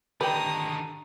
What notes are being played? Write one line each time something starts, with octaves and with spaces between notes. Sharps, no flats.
D3 D#3 G4 B4 D5 G5 A#5 D#6